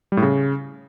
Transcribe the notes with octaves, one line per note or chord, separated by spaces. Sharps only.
G3
A2
C#3